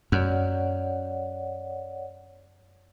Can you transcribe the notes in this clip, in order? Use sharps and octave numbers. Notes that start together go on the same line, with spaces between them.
F#2 C#5 D5 F#5